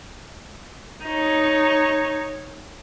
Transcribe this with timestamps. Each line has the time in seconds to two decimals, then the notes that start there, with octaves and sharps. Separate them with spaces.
1.04 D#4 C#5